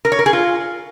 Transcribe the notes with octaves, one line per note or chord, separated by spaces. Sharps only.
A#4
C#5
A#4
G#4
F4